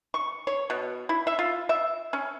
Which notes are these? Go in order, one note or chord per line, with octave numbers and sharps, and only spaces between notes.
C#6
C#5
B2
E4
E5
F4
E5
C#4